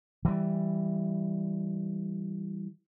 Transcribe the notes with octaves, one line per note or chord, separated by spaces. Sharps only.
E3 G3